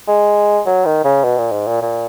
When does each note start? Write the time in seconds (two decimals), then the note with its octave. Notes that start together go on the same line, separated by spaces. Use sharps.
0.08 G#3
0.66 F#3
0.86 D#3
1.04 C#3
1.24 B2
1.38 A#2
1.52 G#2
1.67 A#2
1.82 A#2